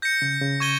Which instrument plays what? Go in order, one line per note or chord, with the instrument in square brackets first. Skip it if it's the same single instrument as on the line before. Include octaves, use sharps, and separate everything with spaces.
[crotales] G6 A#6 C#7
[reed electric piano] C#3
C#3
[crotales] C#6 G#6 D#7 G7